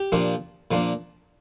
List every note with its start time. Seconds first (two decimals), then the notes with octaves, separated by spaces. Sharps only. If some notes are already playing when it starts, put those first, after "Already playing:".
Already playing: G4
0.12 A#2 F3 A#3 D4
0.71 A#2 F3 A#3 D4